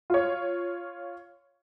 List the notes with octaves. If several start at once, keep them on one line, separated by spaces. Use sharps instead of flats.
F4 C#5